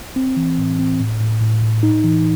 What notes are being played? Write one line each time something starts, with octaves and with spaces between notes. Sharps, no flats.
C4
E3
A2
C4
A2
A2
A2
A2
D#4
E3